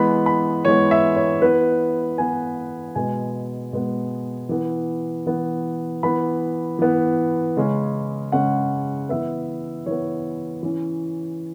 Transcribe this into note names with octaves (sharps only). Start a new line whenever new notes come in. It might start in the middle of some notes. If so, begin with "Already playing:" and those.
Already playing: E3 G#3 B3 B5
B5
E3 G#3 B3 C#5
E5
C#5
E3 B3 B4
E3 B3 G#5
B2 G#3 B3 G#5
B2 G#3 B3
E3 B3
E3 B3
E3 B3 B5
E3 B3
C#3 G#3 C#4
C#3 G#3 C#4 F#5
E3 B3 E5
E3 B3 C#5
E3 C#4